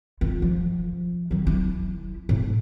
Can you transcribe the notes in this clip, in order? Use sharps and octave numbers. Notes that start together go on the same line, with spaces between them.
D#3 F4
F3
D#3 F#3
E4
A2